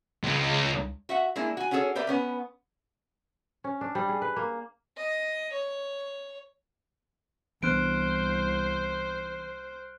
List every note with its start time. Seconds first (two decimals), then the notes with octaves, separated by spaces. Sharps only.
0.23 C#2
1.09 F#4 E5 F#5
1.36 G#3 A#3 D4 E4
1.57 F#4 G#5
1.71 C#4 D4 F#4 G#4 A4 C#5
1.95 G4 A#4 B4 D5 E5
2.07 B3 C#4 B4
3.64 C#4
3.81 D4
3.95 G3
4.09 G#4
4.22 B4
4.36 A#3
4.97 D#5
5.52 C#5
7.63 C2 E3 B3 D4 C5 F6 F#6 D7